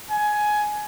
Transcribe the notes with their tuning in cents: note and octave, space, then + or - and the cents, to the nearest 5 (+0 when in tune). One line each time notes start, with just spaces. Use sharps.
G#5 +15